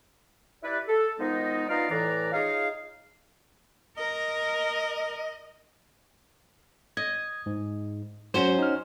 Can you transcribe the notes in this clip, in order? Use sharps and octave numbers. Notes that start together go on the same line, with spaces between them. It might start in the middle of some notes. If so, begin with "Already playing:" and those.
E4 G4 B4 D5
A4
D#3 F3 G#3 B3 D#4
B3 D#4 F4 D5 D#5 F5
A2 E3 D5 A#5
D#4 F4 G#4 C#5 F5
A#4 D#5
D#5 G#6
G#2
F#3 C#4 F#4 C5
D#4 F6